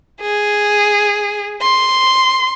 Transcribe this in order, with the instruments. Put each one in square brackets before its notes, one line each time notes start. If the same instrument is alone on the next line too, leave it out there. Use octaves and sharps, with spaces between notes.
[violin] G#4
C6